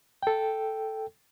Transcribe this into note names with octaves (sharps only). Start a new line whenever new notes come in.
A4 G5